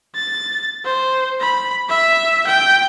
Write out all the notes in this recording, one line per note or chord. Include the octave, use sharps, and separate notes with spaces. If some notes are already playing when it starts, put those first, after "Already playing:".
A6
C5
B5
E5 B6
G5